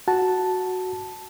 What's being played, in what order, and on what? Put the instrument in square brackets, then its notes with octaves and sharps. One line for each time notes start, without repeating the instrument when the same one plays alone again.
[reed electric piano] F#4 A5